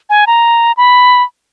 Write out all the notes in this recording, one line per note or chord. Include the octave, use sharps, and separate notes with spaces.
G#5
A#5
B5